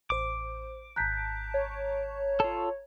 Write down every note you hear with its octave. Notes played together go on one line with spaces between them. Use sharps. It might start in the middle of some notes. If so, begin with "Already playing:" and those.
A1 C5 D6
G#1 A5 A#5 F#6 G6 B6
C#5
F4 A4